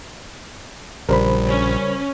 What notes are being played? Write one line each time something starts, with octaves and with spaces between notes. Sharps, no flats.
A#1 C#3 G3 A#4 C5 B5
C#4